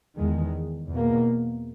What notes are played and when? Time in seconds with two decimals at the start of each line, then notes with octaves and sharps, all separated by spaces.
0.17 E2 D#3 G#3
0.90 E2 B2 A#3